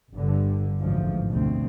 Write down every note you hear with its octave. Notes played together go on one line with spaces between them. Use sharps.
G1 G2 D3
A1 D2 G#2 F3
D2 B2 C4